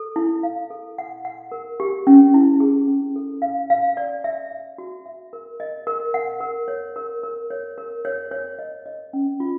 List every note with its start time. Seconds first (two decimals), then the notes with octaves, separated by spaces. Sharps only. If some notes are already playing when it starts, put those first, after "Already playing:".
Already playing: A4
0.16 E4
0.43 F5
0.70 A4
0.98 F#5
1.25 F#5
1.52 A#4
1.80 G4
2.07 C#4
2.34 E4
2.60 G#4
2.87 C#4
3.16 A4
3.42 F5
3.70 F5
3.97 D5
4.24 E5
4.51 E5
4.78 F#4
5.06 E5
5.33 A#4
5.60 D#5
5.87 A#4
6.14 F#5
6.41 A#4
6.68 C#5
6.96 A#4
7.23 A#4
7.50 C#5
7.78 A#4
8.05 C#5
8.31 C#5
8.59 D#5
8.86 D#5
9.13 C#4
9.40 F4